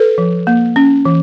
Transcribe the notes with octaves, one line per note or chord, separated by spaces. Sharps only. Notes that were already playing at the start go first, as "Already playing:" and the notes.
Already playing: A4 B4
F3
A#3
C#4
E3